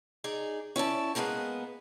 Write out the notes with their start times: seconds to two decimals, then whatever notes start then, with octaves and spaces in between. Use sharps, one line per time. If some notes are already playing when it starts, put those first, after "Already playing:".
0.24 D#4 G#4 D5
0.76 C#4 E4 D5 A5
1.15 G#3 A#3 B3 G#4 B4